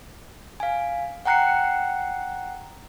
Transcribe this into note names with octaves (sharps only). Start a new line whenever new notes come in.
F5 G#5
F#5 G5 A#5 F#6 C7 C#7